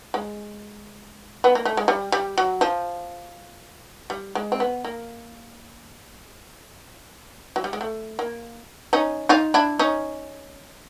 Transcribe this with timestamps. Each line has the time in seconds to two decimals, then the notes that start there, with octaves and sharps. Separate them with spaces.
0.14 G#3
1.44 B3
1.55 A#3
1.65 A3
1.77 G#3
1.88 G3
2.12 G3
2.38 F#3
2.61 F3
4.10 G3
4.35 G#3
4.52 C4
4.60 B3
4.85 A#3
7.56 F#3
7.64 G3
7.73 G#3
7.81 A3
8.19 A#3
8.93 C#4 D#4
9.29 D#4 F4
9.54 D4 E4
9.79 C#4 D#4